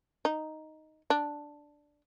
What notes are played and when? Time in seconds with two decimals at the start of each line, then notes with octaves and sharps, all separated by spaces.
0.25 D#4
1.10 D4